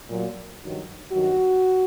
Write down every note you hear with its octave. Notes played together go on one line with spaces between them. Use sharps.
A#2 F#3
G2 D#3 F#3
G2 D#3 F#3 F#4